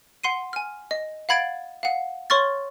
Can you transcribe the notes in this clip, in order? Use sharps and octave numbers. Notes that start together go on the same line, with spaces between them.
F#5 C6 C7 D#7
G#5 F6
D#5
F5 F#5 B5 G#6 A6 D7
F5 F#5
C#5 C6 C#6 F6 A6